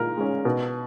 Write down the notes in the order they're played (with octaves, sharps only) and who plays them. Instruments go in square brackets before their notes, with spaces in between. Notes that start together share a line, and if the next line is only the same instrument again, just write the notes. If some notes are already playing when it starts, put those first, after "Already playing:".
Already playing: [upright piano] A#2 G#3 A#4
G#3 C#4
B2